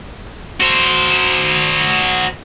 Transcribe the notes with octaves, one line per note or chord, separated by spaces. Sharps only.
F#4 C5